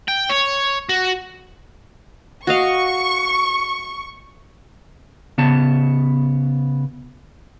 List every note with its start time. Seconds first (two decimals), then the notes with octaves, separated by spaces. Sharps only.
0.08 G5
0.30 C#5
0.89 F#4
2.47 F#4 D#5 F5 C#6
5.38 C#3 B3 A5